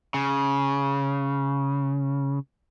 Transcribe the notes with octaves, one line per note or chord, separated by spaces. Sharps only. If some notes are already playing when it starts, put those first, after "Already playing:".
C#3